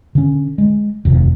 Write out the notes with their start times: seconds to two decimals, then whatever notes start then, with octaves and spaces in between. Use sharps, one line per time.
0.15 D3 C#4
0.58 G#3
1.05 F1 D#2 C3